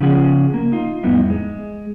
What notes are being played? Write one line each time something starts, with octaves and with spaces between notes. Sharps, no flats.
C#3 F3 C#4 F4 G#4 F#5
A#3
D#4 F4
F2 A2 G3 B3 D#4 E4
G#3